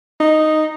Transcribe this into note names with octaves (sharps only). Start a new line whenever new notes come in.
D#4